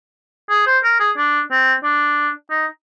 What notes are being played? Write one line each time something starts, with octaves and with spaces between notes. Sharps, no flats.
G#4
C5
A#4
G#4
D4
C4
D4
D#4